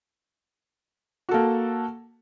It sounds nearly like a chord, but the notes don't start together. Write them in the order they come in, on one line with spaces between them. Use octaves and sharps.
F#4 A4 A#3